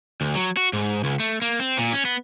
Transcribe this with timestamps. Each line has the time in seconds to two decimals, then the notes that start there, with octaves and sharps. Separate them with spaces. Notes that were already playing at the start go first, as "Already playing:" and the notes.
0.21 D2
0.35 F#3
0.57 F#4
0.73 G#2
1.04 C#2
1.20 A3
1.42 A#3
1.60 C4
1.78 A#2
1.93 C#4
2.05 B3